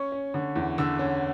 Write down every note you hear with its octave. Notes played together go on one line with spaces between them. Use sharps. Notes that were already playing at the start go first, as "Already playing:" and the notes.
Already playing: C#4 C#6
C#4
D3
E2
D3 E6
C#4